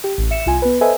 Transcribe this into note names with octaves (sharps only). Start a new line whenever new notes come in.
G4
A1
E5 C#7 E7
C2 F4 G#5
B3 B4
A4 B4 C5 D#5 E5 G#5